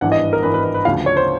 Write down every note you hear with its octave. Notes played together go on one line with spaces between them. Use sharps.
G#1 G2 E3 F#5
D#5
A#4
G#1 G2 E3 B4
B4
B4
B4
D2 C#3 F3 F5
C#5
C5